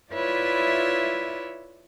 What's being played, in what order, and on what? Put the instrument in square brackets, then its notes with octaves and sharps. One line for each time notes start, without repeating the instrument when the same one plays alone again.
[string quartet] E4 F4 B4 C#5 D5 E5